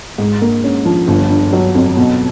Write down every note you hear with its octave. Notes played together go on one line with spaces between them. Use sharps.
G#2
A#3
C#4
F3
G1
D3
F#3
F2
B2